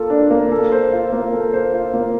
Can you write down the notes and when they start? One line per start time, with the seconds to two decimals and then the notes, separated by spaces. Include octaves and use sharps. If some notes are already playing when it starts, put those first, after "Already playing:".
Already playing: A#3 F4 A4
0.10 D4
0.30 A#3
0.52 A4
0.72 C5
0.92 F4
1.12 A#3
1.33 A4
1.53 C5
1.73 F4
1.93 A#3